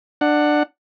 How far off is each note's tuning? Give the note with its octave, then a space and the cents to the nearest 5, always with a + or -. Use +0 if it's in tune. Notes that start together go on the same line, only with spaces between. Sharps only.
D4 +15 F#5 +0